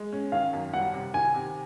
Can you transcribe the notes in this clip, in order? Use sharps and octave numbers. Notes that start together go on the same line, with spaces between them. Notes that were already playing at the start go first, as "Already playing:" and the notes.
Already playing: G#3
C#4
D#3 F5
F#2
G3 F#5
C3
D#3 G#5
C3